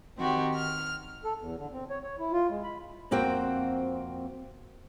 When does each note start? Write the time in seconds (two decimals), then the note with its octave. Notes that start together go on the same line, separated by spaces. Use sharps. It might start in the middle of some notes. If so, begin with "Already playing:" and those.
0.17 D#3 C4 F#4 G4
0.53 F6
1.25 A4
1.39 E2
1.58 D3
1.72 C4
1.90 C#5
2.03 C#5
2.19 E4
2.32 F4
2.50 G#3
2.64 B5
3.11 F2 A#3 C4 F#4 G5